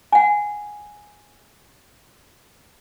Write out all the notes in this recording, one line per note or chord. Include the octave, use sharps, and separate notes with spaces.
F#5 G#5